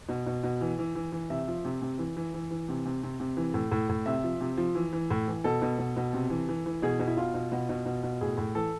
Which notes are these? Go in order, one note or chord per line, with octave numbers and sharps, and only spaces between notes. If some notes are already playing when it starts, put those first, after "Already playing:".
B2
B2
B2
E3
E3
E3
E3
C3 E5
F3
C3
C3
E3
E3
E3
E3
C3
C3
C3
C3
E3
A2
A2
A2
C3 E5
F3
C3
F3
E3
E3
A2
E3
B2 A4
B2
B2
B2
C3
E3
E3
E3
B2 G#4
B2
E4
B2 F4
B2
B2
B2
B2
B2
A2 G#4
A2
E3 A4